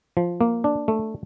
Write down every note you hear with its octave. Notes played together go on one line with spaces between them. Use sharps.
F3
A#3
D4
A3